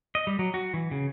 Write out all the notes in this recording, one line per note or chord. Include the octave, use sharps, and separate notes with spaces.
D#5
G3
F#3
F#4
E3
C#3